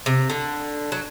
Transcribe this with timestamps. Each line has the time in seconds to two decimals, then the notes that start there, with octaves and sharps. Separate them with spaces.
0.06 C3
0.30 D3
0.92 F#3